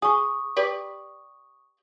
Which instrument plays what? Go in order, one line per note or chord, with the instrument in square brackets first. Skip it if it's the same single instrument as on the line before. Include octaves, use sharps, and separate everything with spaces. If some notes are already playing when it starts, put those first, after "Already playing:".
[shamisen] G#4 [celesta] C#6 D#6
[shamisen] G4 B4 D5